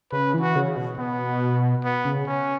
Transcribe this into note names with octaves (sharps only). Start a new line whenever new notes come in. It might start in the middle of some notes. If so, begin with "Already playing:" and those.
C#3 B4
E3
F#4
C#3
B2
B2 B3
B3
C#3
C#4